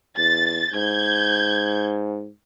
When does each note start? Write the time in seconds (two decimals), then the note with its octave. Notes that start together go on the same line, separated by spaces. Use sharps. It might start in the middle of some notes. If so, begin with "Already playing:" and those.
0.17 E2 A6
0.74 G#2 G6 G#6